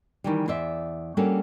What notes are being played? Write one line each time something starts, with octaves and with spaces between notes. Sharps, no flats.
D#3 E3 G3
E2 C5 D5 E5
G3 A#3 C#4 D4 F#4 A4